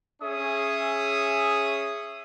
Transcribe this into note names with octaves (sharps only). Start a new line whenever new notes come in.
C#4 G#4 E5 D#6